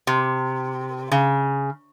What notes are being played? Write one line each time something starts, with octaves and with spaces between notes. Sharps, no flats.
C3
C#3